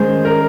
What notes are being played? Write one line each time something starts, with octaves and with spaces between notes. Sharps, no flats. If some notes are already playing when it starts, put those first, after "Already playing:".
Already playing: D#3 G#3 C#4 G#4 C5
A#4